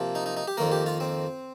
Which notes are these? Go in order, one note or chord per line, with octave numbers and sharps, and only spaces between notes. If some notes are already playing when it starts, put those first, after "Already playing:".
Already playing: C3 F3 A#3
D#4
D#4
D#4
G4
F2 D#3 A#3 A#4
G4
F4
C4